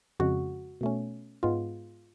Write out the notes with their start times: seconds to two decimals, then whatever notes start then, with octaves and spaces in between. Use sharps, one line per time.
0.20 F2 C#3 G#3 F#4
0.81 B2 A3 C#4
1.43 G#2 G#3 B3 F4